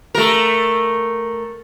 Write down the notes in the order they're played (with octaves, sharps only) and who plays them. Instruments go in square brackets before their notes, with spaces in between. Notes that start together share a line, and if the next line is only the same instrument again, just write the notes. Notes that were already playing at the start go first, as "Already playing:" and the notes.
[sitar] A3 A#4